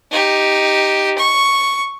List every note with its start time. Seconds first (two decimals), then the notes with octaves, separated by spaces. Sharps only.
0.12 D#4 G4
1.18 C#6